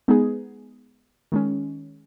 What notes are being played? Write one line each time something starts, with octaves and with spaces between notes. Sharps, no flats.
G#3 B3 D#4 G#4
D#3 G#3 C#4